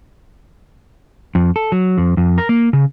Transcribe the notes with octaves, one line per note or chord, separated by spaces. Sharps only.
F2
A4
F#3
F2
F2
A#4
A#3
C#3